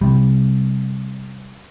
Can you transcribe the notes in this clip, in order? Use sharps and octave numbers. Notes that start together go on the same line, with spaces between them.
C3 G3